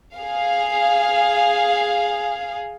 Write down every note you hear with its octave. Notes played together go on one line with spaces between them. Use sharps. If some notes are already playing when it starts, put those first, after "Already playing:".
G#4 F5